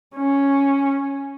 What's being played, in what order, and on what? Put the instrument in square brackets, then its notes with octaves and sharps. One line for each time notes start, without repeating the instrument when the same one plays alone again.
[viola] C#4